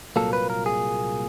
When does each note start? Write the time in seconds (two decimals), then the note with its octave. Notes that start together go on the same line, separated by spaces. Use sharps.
0.16 C2 A#2 F#3 A#3 A4
0.33 B4
0.50 A#4
0.66 G#4